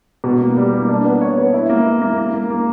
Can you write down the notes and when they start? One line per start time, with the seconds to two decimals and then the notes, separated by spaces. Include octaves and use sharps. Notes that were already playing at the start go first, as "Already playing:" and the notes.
0.24 B2
0.41 A#3
0.57 G3
0.73 A#3
0.89 D4
1.05 B3
1.21 C#5
1.38 B3
1.53 E4
1.69 A#3
1.86 E4
2.01 A#3
2.18 A#3
2.34 A#3
2.50 A#3